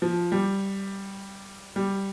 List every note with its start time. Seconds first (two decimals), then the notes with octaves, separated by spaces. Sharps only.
0.02 F3
0.32 G3
1.76 G3